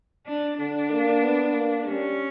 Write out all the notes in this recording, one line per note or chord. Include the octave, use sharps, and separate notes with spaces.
D4
D3 D4
A#3
B3
A#3
G3 C#4